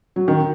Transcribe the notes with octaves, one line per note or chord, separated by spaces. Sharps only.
F#3
D#3